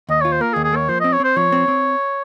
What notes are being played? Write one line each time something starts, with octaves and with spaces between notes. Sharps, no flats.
D#2 D#5
F4 C#5
C5
A#3 A#4
G#4
D#2
G#4
A#3 C#5
F3 C5
C4 D#5
C#5
C4 C5
F3 C#5
C4
C4